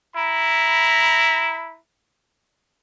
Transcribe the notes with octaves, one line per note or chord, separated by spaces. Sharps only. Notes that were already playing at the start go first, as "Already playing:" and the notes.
E4 A#5 B5